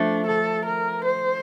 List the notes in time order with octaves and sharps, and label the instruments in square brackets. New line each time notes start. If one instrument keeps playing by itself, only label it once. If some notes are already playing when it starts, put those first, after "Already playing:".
Already playing: [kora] F3 A3 [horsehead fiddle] D4
[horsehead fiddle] A4
A#4
C5